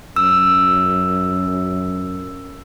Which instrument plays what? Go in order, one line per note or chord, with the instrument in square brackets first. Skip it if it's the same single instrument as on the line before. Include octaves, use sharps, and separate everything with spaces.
[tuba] F#2 [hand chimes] E6